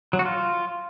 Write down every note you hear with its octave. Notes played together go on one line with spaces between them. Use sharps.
F#3
F#4
F4